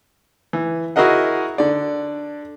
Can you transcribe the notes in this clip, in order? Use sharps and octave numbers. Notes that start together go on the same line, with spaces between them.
E3
E4 F#4 G#4 A#4 D#5 F#5
D3 D5